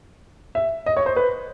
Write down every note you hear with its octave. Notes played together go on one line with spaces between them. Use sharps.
E5
D#5
C#5
C5
B4